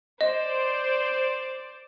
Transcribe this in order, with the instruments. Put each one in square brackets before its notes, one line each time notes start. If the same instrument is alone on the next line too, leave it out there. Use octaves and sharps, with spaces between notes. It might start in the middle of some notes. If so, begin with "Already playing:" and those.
[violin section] C5 D5 [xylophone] D#5